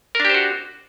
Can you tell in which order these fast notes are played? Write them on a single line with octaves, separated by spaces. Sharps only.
A#4 D4 G4 C5 F#4